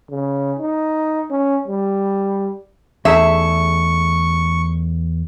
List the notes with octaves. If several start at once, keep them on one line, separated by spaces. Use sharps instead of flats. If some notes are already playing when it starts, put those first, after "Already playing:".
C#3
D#4
C#4
G3
E2 A3 D#4 G#4 E5 C#6